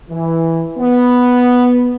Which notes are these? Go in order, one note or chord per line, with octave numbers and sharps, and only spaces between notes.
E3
B3